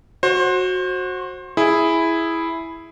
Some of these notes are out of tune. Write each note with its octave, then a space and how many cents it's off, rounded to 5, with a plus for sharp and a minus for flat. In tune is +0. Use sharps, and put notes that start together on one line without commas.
F#4 -10 C5 +25
E4 +0 G#4 +0